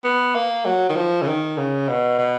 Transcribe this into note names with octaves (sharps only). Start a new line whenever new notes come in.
B3
A#3
F#3
D#3
F3
C#3
D#3
C#3
B2
B2